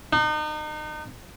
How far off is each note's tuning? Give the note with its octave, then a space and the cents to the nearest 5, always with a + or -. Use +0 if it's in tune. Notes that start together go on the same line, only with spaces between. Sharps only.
D#4 -35